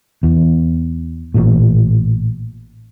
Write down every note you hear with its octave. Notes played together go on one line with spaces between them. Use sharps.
E2
A1 A#2